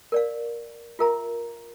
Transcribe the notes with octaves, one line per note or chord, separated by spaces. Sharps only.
A#4 D5 F5
F4 A#4 E5 A#5